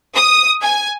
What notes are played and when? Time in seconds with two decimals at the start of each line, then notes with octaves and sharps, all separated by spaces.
0.14 D#6
0.62 G#5